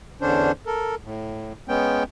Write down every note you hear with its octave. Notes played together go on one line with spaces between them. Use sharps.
E2 D3 C#4 D4 C5
A4 A#4
A2
G#3 B3 C#4 G5